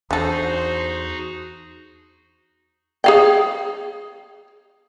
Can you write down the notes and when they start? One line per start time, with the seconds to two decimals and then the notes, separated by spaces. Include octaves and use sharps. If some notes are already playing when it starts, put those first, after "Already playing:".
0.11 E2 D3 D#4 F#4 G#4 A4 C5
3.04 G#4 F5 G5